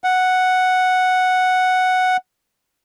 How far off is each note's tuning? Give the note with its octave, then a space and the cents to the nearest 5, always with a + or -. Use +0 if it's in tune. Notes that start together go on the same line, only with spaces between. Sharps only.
F#5 +0